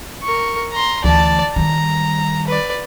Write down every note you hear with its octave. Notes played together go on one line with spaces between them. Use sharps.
A#4 C#6
A#5 C6
D2 E3 D5 A5
D#3 G3 A#5
B4 D5